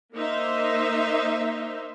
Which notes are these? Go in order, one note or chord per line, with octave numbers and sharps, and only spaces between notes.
A#3 D#4 C5 E5